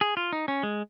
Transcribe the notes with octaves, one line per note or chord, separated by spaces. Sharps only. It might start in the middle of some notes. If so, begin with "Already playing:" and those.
G#4
F4
D#4
C#4
G#3